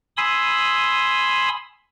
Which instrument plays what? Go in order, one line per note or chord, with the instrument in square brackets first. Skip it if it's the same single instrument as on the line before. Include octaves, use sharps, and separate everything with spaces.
[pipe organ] G#5 B5 C6 D#6 E6